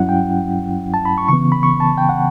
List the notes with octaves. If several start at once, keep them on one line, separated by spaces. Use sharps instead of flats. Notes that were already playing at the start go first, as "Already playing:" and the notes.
Already playing: G2 F#3 C#4 E4 F#5
G5
A5
B5
C#6
C#3 E3 B3 C#6
B5
C#6
A5
G5
F#5